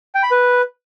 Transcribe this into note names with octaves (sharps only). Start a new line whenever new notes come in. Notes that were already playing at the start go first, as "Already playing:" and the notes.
G5
B5
B4